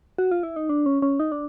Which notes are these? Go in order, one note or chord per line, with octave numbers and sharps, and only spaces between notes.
F#4
F4
E4
D#4
D4
C#4
C#4
D#4
D4